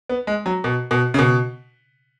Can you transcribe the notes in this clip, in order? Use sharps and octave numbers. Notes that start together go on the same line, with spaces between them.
B3
G#3
F#3
B2
B2
C#3
B2